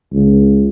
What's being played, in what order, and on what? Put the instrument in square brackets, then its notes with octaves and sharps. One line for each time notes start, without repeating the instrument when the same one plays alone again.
[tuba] C#2